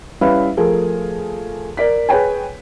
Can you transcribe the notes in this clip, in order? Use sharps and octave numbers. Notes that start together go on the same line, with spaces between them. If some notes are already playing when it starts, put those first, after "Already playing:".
G3 C#4 E4 B4 E5 F5
F3 A3 G#4 A#4
A#4 D5 B6
G#4 B4 C#5 G5 G#5